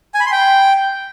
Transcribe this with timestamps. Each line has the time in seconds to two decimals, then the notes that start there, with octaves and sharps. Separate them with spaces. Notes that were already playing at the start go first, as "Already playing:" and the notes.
0.14 G#5
0.20 B5
0.26 C6
0.32 G5